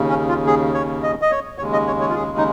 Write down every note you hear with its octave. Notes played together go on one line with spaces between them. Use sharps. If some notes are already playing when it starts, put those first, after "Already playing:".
Already playing: D#2 C#3
C#4
F4
G#4
C#5
D#5
D#5
C#5
D#2 C#3 G#3 C#5
D#5
C#5
C#5
F4
G#4
D#4